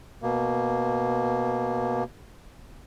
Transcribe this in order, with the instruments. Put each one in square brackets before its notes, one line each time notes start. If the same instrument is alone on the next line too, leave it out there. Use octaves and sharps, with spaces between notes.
[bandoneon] B2 A#3